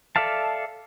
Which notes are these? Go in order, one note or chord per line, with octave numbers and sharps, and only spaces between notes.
A4 D5 E5 F5 A5